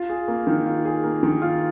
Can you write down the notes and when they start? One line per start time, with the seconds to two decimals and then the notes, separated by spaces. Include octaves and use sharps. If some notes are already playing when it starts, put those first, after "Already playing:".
Already playing: F4
0.09 G#4
0.28 A#3
0.47 D#3
0.66 F4
0.85 G#4
1.04 A#3
1.23 D#3
1.42 F4